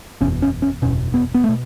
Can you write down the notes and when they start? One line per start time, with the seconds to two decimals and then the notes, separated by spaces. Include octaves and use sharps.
0.21 F#1 E2 B2 C#4
0.42 C#4
0.62 C#4
0.82 F#1 E2 B2 C#4
1.14 B3
1.34 B3
1.44 A3
1.49 B2